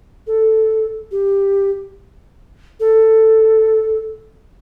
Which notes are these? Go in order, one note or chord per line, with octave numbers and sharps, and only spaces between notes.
A4
G4
A4